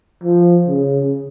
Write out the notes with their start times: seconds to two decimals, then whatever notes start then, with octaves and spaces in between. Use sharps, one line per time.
0.23 F3
0.68 C#3